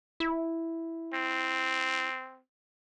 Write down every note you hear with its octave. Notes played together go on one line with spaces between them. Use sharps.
E4
C4